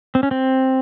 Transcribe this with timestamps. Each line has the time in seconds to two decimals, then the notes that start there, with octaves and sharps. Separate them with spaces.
0.15 C4
0.23 C#4
0.31 C4